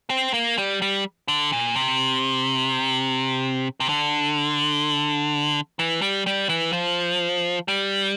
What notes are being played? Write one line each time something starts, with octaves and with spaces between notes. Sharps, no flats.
C4
A#3
G3
G3
D3
A#2
C3
C3
D3
E3
G3
G3
E3
F3
G3